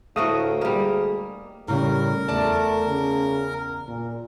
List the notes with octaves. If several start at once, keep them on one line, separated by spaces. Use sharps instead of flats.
D2 A2 A3 F#4 A#4 F5 D#6
G3 G#3 A#3
A2 C#3 G3 A#4
E2 A3 D5 A5
C#3
A#2